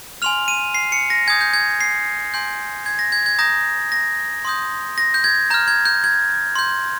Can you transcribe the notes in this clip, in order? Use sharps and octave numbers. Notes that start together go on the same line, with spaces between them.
G#5 C6 F6 F7
D#7
C7
C#7
A#6
G#5 D#6 G6 G#6
G6
G#6
C7
G#5 C6 G6
G#6
A#6
G#6
G#6
A#5 D#6 G6 A#6
A#6
C6 D#6 G6
A#6
G6
G#6
A#5 F6 G6
G#6
G6
G#6
C6 G6